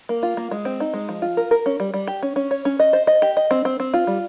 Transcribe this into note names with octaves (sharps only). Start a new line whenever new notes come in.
A#3
F4
A#3
G#3
C4
D#4
G#3
F3
F4
A#4
A#4
C#4
G3
G3
G4
C#4
C#4
C#5
C#4
D#5
C5
D#5
G4
D#5
C4
C4
C4
F4
G3